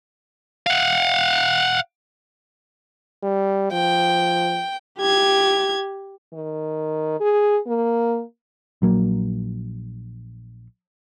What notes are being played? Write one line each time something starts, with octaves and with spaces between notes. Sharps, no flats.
F5 F#5
G3
F3 G5
G4 G#6
D#3
G#4
A#3
A#1 F#3 A#3